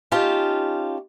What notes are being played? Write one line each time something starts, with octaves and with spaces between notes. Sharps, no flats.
C#4 D#4 F4 G4 A5